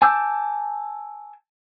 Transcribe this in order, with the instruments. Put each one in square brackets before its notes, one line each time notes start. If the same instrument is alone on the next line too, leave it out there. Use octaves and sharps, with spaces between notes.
[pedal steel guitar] G#5 A5 D6 E6 G6